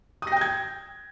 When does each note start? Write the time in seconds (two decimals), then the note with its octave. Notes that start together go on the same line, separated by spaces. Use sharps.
0.22 D#6
0.27 A#6
0.32 G5
0.36 G6
0.41 G#6